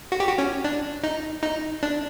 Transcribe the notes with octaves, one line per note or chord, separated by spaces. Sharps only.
F#4
G4
F#4
C#4
D4
D#4
D#4
D4